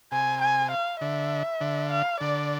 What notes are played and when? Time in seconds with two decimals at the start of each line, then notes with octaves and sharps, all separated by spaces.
0.12 C3 G#5
0.42 G#5
0.71 F5
1.01 D3 E5
1.61 D3
1.91 F5
2.21 D3 D5